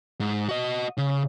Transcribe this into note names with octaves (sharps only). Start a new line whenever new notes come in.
G#2
F#4 D#5
C#3